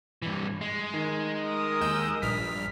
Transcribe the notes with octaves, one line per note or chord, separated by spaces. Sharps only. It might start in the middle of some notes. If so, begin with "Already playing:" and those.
G2 E3
G#3
D#3
A#4 D#6
D#2 E6 G6
A#1 G2 F6 B6